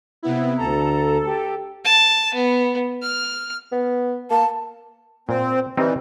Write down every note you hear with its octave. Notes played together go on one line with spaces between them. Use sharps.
C3 B3 E4
D2 A4 A#5
G4
A5
B3
F6
B3
A#3 A5
A#2 C4
E3 G3 C4 D#4